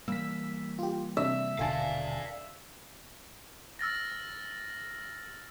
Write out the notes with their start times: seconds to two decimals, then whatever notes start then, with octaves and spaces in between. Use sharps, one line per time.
0.08 E3 G3 A#3 E6 B6
0.79 F4 G4
1.17 C3 D4 E5
1.59 D#1 B2 D3 A4 D5 F5 G#5 A5
3.79 E6 F6 A6 A#6